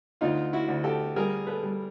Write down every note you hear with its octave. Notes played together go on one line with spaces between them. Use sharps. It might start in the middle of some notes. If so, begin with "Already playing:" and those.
D2 D#4 F4
E4 F#4
D2
G4 A4
G3 G#4 A#4
A4 B4
G3